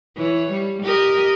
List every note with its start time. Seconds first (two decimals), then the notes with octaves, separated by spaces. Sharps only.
0.16 E3 C#5
0.51 G3
0.82 G4 A#4 D#5